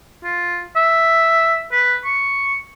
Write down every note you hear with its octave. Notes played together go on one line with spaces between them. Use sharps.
F4
E5
B4
C#6